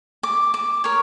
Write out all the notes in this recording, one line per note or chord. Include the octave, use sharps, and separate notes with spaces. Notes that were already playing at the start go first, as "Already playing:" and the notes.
D6
D6
A#4 C#5